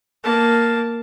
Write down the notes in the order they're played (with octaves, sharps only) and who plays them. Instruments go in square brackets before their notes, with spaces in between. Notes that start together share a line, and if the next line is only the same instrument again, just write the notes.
[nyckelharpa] A#3 A5